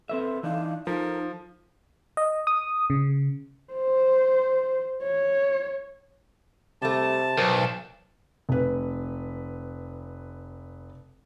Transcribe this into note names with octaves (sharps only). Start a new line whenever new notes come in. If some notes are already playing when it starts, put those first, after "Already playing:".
C4 A4 B4 E5
E3 D4 D#4 F5
F3 D#4 A4 A#4
D#5
D#6
C#3
C5
C#5
C3 G3 A3 A5
B1 A#4 C5 D5
F1 B4